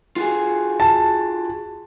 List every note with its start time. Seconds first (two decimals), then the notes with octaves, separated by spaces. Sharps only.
0.16 F4 F#4 G#4
0.80 A5